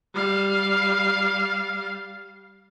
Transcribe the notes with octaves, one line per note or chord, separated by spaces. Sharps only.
G3 F5